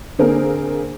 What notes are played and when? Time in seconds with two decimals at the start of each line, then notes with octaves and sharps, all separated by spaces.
0.19 D3 A#3 C4 D4 G#4 A#4